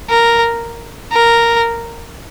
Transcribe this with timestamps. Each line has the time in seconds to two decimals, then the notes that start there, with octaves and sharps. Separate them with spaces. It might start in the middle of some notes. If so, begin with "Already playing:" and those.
0.10 A#4
1.12 A#4